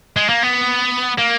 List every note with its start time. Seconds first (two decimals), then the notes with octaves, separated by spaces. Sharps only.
0.17 G#3
0.29 A#3
0.43 B3
1.18 A#3